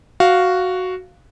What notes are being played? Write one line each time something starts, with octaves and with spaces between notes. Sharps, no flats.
F#4 F5